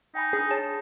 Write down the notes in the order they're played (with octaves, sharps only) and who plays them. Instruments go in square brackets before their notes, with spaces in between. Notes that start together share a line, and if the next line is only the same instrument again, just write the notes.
[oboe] D#4 [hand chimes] G5 G#5 B5
[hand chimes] D4 F6 [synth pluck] G#4
[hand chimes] C#5 [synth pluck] A5